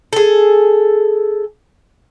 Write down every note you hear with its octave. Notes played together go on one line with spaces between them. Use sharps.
G#4 A4